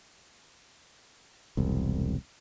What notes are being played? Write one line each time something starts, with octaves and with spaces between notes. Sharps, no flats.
E1 C2